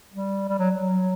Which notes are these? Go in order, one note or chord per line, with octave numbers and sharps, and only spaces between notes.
G3
G3
F#3
F#3